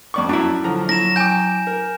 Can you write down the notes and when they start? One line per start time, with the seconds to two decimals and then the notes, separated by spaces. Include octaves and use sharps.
0.14 F2 D5 C#6
0.29 F#2 D4 E4 F#4
0.64 D3 F3 F#3 A#5
0.89 F#3 E4 A#6 E7
1.16 G5 G#5 D6 G6
1.67 A#4